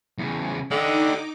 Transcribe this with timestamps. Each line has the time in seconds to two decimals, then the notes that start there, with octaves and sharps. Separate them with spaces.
0.18 E2 C#3
0.71 D3 D#4 G4 D#5 D6